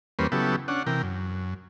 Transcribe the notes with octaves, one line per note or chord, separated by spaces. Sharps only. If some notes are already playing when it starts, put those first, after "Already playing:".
E2 G3 A#3 C#4 B4 C5
C#3 F#3 B3 E4 G4 A4
C#4 D4 F#5
C3 E3 A#4 G5
F#2